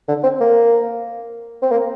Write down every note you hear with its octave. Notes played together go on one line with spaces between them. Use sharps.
D3
C4
A#3
C4
A#3